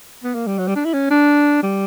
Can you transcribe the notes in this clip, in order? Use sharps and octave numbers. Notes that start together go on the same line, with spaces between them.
B3
A#3
G3
F#3
G3
D4
E4
C#4
D4
G3